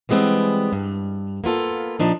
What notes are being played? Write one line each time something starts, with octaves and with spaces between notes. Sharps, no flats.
E3 G3 G#3 B3 C4
G2
A#3 B3 F4 A4
A#2 F3 D4 D#4